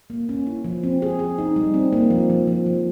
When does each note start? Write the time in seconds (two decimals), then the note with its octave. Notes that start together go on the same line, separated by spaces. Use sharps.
0.10 A#3
0.29 C#4
0.47 E4
0.65 F3
0.84 C4
1.02 G#4
1.19 G#4
1.38 D#4
1.56 G3
1.74 C4
1.93 A#3
2.10 F3
2.30 F3
2.47 F3
2.66 F3